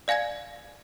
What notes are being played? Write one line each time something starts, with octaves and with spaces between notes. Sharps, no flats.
D5 F5 G#5 G#6 A#6